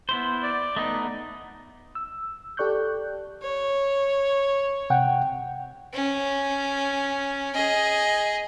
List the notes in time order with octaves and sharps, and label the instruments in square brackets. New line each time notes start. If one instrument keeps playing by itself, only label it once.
[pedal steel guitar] B3 E4 C5
[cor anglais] D5
[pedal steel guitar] A3 B3 D#4 [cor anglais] D#5
[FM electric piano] E6
G4 A4 D5 C#6 F#6 G6
[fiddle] C#5
[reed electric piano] C3 F#5 G5
[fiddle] C#4
G#4 D#5